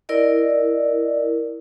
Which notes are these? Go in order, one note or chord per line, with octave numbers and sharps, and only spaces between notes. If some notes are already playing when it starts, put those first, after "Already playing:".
E4 A#4 D5 D#5